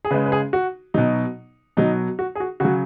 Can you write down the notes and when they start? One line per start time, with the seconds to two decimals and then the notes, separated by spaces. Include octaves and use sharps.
0.05 G#4
0.11 C#3 G#3 B4
0.26 B4
0.32 G#4
0.53 F#4
0.94 B2 F#3 D#4
1.77 B2 F#3 D#4
2.19 F#4
2.35 G#4
2.40 F#4
2.60 C#3 F#3 F#4